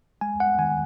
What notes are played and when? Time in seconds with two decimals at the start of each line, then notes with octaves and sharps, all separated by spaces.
0.21 G#3 G#5
0.40 F#5
0.58 D#3 G#5